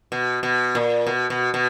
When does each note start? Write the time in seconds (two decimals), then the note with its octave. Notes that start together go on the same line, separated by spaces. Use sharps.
0.12 B2
0.43 B2
0.75 A#2
1.07 B2
1.30 B2
1.54 B2